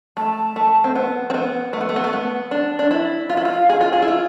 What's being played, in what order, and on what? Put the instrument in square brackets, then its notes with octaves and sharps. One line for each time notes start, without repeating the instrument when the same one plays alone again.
[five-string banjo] A3 [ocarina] A5
[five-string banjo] A3
C4
B3
C4
B3
A3
B3
A3
B3
A3
B3
D4
D4
E4
[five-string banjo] F4 [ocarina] F5
[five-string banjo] E4
F4
G#4
F4
G#4
E4
F4